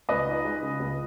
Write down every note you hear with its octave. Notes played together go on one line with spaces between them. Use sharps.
C#2 B4 D#5
D#4
G#3
C#3
C#2